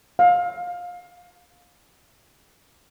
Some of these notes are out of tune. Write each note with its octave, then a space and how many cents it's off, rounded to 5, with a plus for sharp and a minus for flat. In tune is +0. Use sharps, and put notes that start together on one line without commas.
F5 +25